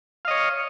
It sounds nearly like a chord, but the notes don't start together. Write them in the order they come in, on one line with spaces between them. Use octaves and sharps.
F5 D#5 C#5